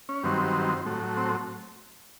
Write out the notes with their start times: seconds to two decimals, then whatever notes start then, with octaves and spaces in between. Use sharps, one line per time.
0.09 C#4
0.23 G2 D#3 F#3 C4
0.86 A2 F#3
1.17 C4